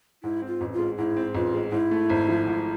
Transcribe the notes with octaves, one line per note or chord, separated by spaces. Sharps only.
G#2 E4
C4
F4
A1
F4
G#3
G#2 E4
C4
A1 F4
G#3
G#2 E4
A3
G#1
F3
G#2